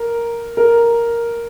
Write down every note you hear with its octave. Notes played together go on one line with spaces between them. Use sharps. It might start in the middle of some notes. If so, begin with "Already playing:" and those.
Already playing: A#4
A#4